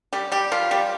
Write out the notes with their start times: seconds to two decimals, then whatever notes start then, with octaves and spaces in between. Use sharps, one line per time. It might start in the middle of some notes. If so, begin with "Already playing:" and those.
0.13 G3 G4
0.32 G3 G4
0.52 F3 F4
0.71 G3 G4